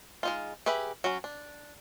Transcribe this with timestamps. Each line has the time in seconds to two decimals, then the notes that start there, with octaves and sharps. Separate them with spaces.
0.23 G#3 D#4 F4
0.66 G4 G#4 B4 E5
1.04 F#3 C#4
1.24 D4